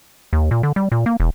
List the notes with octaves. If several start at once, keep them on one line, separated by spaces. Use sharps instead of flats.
D#2
A#2
D3
G3
A#2
A#3
E1